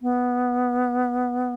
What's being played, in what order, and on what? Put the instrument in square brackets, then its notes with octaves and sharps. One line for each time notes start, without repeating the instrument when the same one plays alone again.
[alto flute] B3